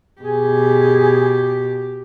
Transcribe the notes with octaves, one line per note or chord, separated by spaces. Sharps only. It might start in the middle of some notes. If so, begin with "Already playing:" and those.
B2 G4 G#4